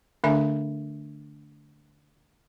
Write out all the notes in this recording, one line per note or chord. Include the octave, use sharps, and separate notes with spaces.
D3 A3 D4 A4 E5 G#5